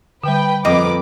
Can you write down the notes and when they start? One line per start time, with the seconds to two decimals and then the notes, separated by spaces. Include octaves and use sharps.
0.24 D3 G3 B4 G5
0.65 F2 A#3 B3 B4 D#5 D6